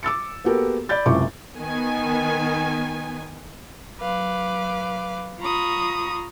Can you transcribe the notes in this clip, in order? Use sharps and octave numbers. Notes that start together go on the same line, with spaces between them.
D6 E6 A6 C#7
A#3 B3 F#4 G4 A4 A#4
D5 B5 G6 A6
F#1 C#2 C3 E4 C#6 D6
D#3 B3 G#5
F#3 B4 F5 D6
F4 A#5 B5 C#6 D#6